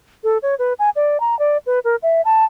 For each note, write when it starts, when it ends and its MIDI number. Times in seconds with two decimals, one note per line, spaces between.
0.24 0.38 69
0.42 0.55 73
0.59 0.73 71
0.79 0.90 80
0.96 1.20 74
1.20 1.38 82
1.39 1.57 74
1.66 1.79 71
1.84 1.96 70
2.02 2.21 76
2.25 2.45 81